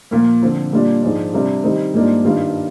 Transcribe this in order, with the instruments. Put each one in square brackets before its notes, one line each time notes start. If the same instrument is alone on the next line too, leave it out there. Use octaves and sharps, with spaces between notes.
[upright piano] A#2 F3 A#3
D3 F3 C4
A#2 G3 D4 F4
G#2 F3 G#3 D4
C3 G3 D4 F4
D#3 G3 C4 D#4
G#2 G3 A#3 D4 F4
G2 D#3 G3 D4 F4